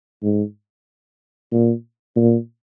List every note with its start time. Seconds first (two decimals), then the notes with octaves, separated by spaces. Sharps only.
0.23 G#2
1.52 A#2
2.17 A#2